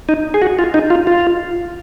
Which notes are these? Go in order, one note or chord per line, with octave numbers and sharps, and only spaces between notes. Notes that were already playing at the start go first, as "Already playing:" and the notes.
D#4
G#4
F#4
F4
D#4
F4
F4